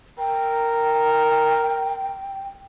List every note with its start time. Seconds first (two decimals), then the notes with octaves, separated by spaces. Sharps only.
0.19 A#4 G5